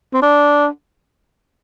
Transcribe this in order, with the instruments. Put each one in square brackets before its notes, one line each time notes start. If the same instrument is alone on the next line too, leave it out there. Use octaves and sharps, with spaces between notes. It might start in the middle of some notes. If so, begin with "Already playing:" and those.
[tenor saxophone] C4
D4